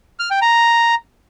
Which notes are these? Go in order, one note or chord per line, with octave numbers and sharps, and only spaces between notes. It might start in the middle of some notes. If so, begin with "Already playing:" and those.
F6
G5
A#5